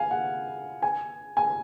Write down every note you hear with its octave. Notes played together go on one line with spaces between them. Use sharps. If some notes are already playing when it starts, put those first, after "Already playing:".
Already playing: F5 G#5
F#5
G#5
G#5